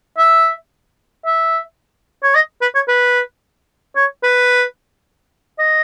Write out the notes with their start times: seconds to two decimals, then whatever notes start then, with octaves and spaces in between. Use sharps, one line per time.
0.18 E5
1.26 E5
2.23 C#5
2.35 D#5
2.62 B4
2.75 C#5
2.88 B4
3.96 C#5
4.23 B4
5.59 D#5